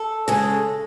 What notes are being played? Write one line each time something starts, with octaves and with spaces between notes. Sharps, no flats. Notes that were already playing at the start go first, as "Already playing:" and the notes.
Already playing: A4
C#3 G#3